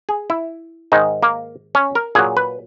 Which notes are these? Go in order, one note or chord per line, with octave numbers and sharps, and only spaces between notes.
G#4
E4
G#2 D#3 G#3 D#4
A#3
C#4
A#4
A#2 F#3 G#4
B4